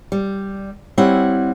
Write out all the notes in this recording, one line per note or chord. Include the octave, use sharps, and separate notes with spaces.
G3
G3 C4 E4 C#5 F#5